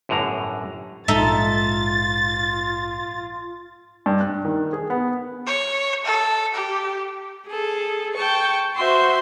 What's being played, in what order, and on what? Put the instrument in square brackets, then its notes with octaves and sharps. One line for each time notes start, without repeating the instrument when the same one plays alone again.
[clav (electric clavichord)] G1 F#2 A2 D3 A#5
[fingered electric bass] A#1 G#2 [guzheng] D#4 A4 E5 [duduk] F4 [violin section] A6
[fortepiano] G2
F#6
D#3
G#4
B3
[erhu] C#5
A4
G4
[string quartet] G#4 A4
G5 A5 C#6
F#4 C5 E5 C6